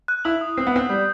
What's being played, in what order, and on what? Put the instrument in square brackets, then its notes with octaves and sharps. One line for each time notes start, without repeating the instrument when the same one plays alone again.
[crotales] F#6
[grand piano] E4 [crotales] F#7
[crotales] D#6
[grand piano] C4 [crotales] C7
[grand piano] B3
[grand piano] C4 [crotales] F#6
[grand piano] G3 [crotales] G6